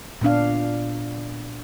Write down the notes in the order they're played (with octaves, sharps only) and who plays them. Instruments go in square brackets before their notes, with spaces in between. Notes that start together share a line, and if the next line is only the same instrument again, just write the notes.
[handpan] A#2 B3 D4 F5